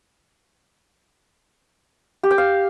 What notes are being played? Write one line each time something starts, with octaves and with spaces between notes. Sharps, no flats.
G4
G5
F5